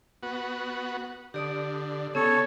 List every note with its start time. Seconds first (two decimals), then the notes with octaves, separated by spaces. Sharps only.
0.23 B3 F#4
1.34 D3 G4 D5 D#6
2.15 C#3 B3 A4 C#5